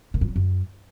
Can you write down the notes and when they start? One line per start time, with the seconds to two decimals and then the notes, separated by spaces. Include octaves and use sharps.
0.14 A#2
0.21 G2
0.28 F#3
0.36 F#2